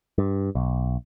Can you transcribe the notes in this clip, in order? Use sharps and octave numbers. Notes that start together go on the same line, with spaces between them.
G2
B1